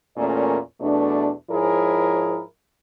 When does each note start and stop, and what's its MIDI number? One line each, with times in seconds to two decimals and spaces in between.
0.17 0.58 40
0.17 0.58 46
0.17 0.58 57
0.17 0.58 61
0.17 0.58 70
0.17 0.58 74
0.81 1.32 40
0.81 1.32 47
0.81 1.32 57
0.81 1.32 62
1.50 2.41 44
1.50 2.41 53
1.50 2.41 64
1.50 2.41 68
1.50 2.41 70
1.50 2.41 73